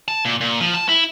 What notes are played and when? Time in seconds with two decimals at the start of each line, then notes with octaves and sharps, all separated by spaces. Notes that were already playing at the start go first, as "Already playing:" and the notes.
0.08 A5
0.25 A#2
0.41 A#2
0.60 F3
0.74 A5
0.89 E4